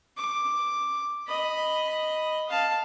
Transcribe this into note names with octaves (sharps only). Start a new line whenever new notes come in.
D6
D#5 B5
F5 A5